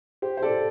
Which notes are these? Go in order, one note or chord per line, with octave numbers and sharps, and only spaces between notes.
G4 C5
C5
A4 D5